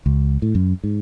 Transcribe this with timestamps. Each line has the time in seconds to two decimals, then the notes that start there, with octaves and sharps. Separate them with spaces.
0.06 C#2
0.42 A2
0.55 F#2
0.84 G#2